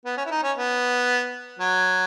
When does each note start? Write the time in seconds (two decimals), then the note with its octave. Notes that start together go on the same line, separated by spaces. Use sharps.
0.05 B3
0.17 C#4
0.26 E4
0.31 D#4
0.43 C#4
0.57 B3
1.59 F#3